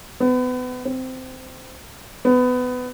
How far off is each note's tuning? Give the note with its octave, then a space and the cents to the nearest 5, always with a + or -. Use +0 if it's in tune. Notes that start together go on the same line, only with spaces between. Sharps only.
B3 +30
C4 -15
B3 +20